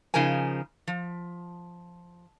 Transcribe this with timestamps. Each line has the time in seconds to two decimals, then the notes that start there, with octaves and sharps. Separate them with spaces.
0.14 C#3 F3 D#4 A#4 G#5
0.87 F3